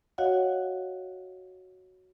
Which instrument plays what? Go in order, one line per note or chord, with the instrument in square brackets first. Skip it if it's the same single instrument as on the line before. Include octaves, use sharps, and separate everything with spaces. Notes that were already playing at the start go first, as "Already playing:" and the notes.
[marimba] F#4 C#5 D#5 F5 F#5